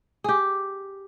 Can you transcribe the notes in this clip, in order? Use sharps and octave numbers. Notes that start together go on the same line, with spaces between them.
G4 G#4